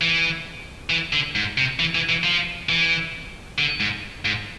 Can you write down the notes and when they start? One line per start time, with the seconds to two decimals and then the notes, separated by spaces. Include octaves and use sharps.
0.01 E3
0.90 E3
1.13 D3
1.35 G#2
1.58 C3
1.79 E3
1.95 E3
2.09 E3
2.23 F3
2.69 E3
3.58 D3
3.80 G#2
4.25 G#2